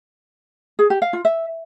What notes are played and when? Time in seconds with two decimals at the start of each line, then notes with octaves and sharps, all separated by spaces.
0.79 G#4
0.90 G4
1.02 F5
1.13 F4
1.25 E5